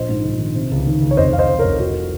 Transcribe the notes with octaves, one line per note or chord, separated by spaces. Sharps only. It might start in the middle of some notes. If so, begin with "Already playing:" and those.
Already playing: A#1 C5 D#5
G#2
A#1
D#3
C3
C#2
D#3
C#2
C#5
F1 C5 D#5
F1 F5
C5 D#5
F1
A#4 C#5
F1
C2 F#4 A#4